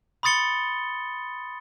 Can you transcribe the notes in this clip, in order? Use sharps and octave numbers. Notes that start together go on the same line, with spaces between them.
B5 C6 D#6 A6 C#7 G7